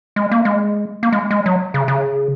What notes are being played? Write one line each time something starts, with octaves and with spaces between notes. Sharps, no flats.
G#3
A#3
G#3
A#3
G#3
G#3
F#3
C#3
C#3